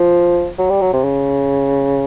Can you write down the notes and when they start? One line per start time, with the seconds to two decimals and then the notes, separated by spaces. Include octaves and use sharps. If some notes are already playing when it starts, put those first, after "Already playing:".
Already playing: F3
0.59 F#3
0.70 G3
0.81 F#3
0.93 C3
1.04 C#3